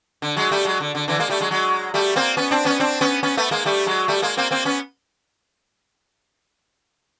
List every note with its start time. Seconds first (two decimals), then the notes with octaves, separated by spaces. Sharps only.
0.22 D3
0.37 F#3 G#3
0.51 G3 A3
0.65 F#3 G#3
0.80 D3
0.95 D3
1.08 D3 E3
1.19 G#3 A#3
1.30 G3 A3
1.40 F#3 G#3
1.51 F#3 G#3
1.94 G3 A3
2.16 A#3 C4
2.37 B3 C#4
2.51 C4 D4
2.65 B3 C#4
2.80 C4 D4
3.01 B3 C#4
3.23 B3 C#4
3.37 A3 B3
3.51 G#3 A#3
3.65 G3 A3
3.86 F#3 G#3
4.08 G3 A3
4.22 G#3 A#3
4.37 A#3 C4
4.51 A#3 C4
4.65 B3 C#4